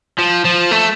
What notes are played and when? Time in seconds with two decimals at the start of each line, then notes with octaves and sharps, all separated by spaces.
0.18 F3
0.45 F3
0.71 A3